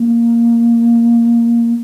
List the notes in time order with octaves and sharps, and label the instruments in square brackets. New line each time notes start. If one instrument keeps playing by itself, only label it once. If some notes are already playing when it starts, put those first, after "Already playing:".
Already playing: [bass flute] A#3